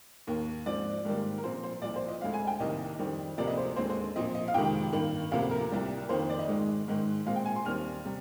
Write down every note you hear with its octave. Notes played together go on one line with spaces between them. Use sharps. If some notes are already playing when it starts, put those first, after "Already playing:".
D#2 D#3 A#3
G#2 F3 C4 D5
G#2 D#3 G3 A#3
A#4
A#2 F3 C4 C5
C5
C2 A#2 F3 D5
C5
D#5
D2 D3 G#3 C4 F5
G#5
G5
C2 C3 D#3 A#3 D#5
F2 D#3 G3 C4
D2 C3 F3 A#3 D5
D#5
C5
D#2 D3 G#3 C4 C5
C5
A#2 F3 C4 D#5
D#5
F5
F2 C3 D#3 G#3 G5
G2 D#3 A#3
D2 C3 F3 A#3 F5
A#4
C2 C3 G3 A#3
F2 D#3 A#3 C5
C5
D5
D#5
G#2 D#3 G#3
G#2 D#3 G#3
A#2 G#3 C4 F5
G5
G#5
C6
D#2 D#3 G3 C4 F6
C3 G3